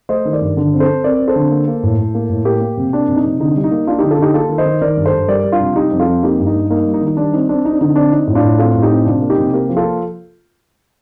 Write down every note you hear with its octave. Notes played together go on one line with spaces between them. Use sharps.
A3 C5 D#5
D#3
A#4 D5
G2
D3
C4
A4 C5
C4
C4 A#4 D5
C4
A4 C5
D3
A#3
A#3
A2
A2
A#3
A2
A#3 G4 A#4
A#3
C3
A#3 D4
C3
D#4
C3
D3 D#4
G3
D#4
A#3
A#3 D4 F4
D3 D#4 G4
F4 A4
D3 D#4 G4
A#3 F4 A4
D#3
C5 D#5
D#3
D#3 A#4 D5
G2
A4 C5
G2
G3 A#4 D5
G3
D4 F4
C3
G3 D#4 G4
F2
F4 A4
F2
A#3 D#4 G4
G2
D#4
G3
A#3 D#4
G3
D#4
D#3
D#4
G3 D4
C4 D#4
C4 D4
C4 D#4
D4
D3 D#4
C4 D4
C4 D#4
A2
D4 F4
A2
C4 F4 A4
A2
D#4 G4
C4
C3 D4 F4
A#3
D#4 G4
C3
A#3 G4 A#4
F3
F4 A4
A#3